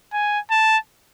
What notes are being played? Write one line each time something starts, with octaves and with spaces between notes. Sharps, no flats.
G#5
A5